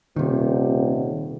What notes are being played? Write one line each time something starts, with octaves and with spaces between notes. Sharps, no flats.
D#1 C3 D#3